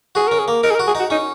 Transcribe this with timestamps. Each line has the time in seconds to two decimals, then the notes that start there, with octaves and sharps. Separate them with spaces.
0.15 F#4 G#4
0.28 C#4 A#4
0.39 G#4
0.48 A#3
0.63 D#4 A#4
0.71 G#4
0.75 A#4
0.80 F#4
0.87 G#4
0.95 D#4 F#4
1.10 C#4 D#4